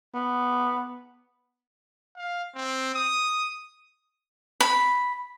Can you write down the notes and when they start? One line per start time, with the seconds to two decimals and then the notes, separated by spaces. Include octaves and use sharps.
0.14 B3
2.16 F5
2.55 C4
2.95 D#6
4.61 B5